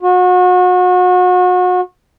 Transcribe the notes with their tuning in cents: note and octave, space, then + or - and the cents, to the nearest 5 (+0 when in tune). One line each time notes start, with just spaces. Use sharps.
F#4 -35